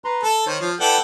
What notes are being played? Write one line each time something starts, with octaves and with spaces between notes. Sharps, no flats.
B4 A#5 C6
A4 A5
D#3 C5 C#5
F3
E4 A4 B4 D5 F#5 G5